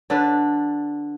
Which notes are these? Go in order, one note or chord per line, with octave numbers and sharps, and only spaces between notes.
D3 D4 B4